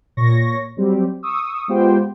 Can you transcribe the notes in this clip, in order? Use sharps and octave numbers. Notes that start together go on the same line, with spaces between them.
A#2 C#5 C#6 A#6
F#3 G3 C4 G4
C#6 D#6 E6
G#3 B3 F4 G4 C5 G5